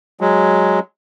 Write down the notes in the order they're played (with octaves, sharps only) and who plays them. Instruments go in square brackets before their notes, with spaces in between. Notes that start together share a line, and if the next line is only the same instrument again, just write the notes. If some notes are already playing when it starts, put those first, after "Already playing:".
[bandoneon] F#3 G#3